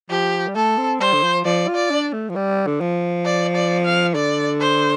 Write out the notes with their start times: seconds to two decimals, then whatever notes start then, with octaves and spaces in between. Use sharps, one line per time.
0.10 F3 G4
0.48 G3
0.55 A3 A4
0.78 C4
1.00 G3 C5
1.14 D3
1.23 F3
1.45 F3 D5
1.68 F4
1.76 D5
1.90 D4
2.13 A3
2.29 F3
2.36 G3
2.67 D3
2.81 F3
3.25 D5
3.56 D5
3.85 F5
4.15 D3 D5
4.61 C5